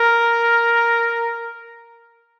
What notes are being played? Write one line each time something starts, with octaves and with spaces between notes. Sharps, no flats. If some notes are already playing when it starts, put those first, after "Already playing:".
Already playing: A#4